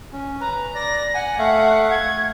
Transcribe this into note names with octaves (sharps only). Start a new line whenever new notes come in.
C#4
B4 A#5
D5 A#6
F#5 G#5
A3 E5 F5
G#6